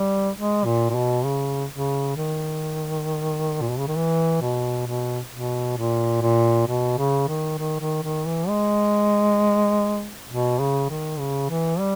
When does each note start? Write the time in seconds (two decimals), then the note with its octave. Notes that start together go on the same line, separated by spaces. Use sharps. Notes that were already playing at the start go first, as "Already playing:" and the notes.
Already playing: G3
0.35 G#3
0.65 A#2
0.90 A#2
0.95 B2
1.25 C#3
1.71 C#3
2.16 D#3
3.61 A#2
3.70 B2
3.79 C#3
3.88 D#3
3.96 E3
4.42 B2
4.87 B2
5.32 B2
5.78 A#2
6.22 A#2
6.67 B2
6.98 C#3
7.28 D#3
7.58 D#3
7.80 D#3
8.03 D#3
8.26 E3
8.49 G#3
10.30 B2
10.59 C#3
10.90 D#3
11.19 C#3
11.50 E3
11.80 G3